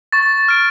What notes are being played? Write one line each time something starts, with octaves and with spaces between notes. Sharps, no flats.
C#6 A6
F6 D7